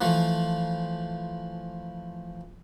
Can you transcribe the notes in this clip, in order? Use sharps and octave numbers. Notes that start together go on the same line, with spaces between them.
E3 F3 A3